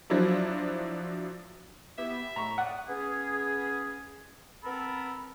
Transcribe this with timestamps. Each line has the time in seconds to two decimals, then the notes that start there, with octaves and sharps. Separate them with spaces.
0.10 F3 F#3 D4 E4
1.98 B3 E4 G4 E5
2.36 A2 A#5 C#6
2.58 D5 F#5 D#6
2.87 B3 C#4 G#4
4.63 B3 C4 A4 A#4 B5